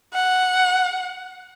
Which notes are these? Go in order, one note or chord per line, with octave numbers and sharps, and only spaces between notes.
F#5